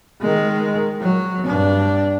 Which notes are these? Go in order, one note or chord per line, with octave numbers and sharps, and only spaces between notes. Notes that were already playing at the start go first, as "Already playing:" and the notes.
D#3 G#3
F#3
G2 D4